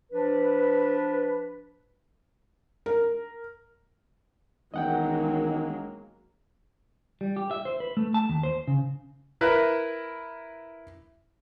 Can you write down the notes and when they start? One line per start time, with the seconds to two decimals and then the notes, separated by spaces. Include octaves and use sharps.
0.12 F3 D4 B4
2.86 A#4
4.74 E1 D#3 F#3 G#3 A#3 D#5 F#5 G5
7.21 G3
7.36 G4
7.51 E5
7.65 C5
7.80 B4
7.97 A3
8.14 A5
8.29 D#2
8.43 C5
8.68 C#3
9.41 E4 A#4 B4